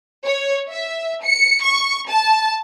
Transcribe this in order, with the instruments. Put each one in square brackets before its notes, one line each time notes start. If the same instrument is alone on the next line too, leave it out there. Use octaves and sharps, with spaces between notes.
[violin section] C#5
E5
C#7
C#6
A5